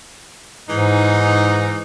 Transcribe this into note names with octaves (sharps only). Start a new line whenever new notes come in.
G#2 E3 G#3 D#4